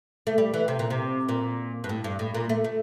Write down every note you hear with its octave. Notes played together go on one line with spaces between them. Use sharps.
A3
G3
E3
C3
A#2
C3
A#2
G2
A2
G2
A2
A#2
A3
A3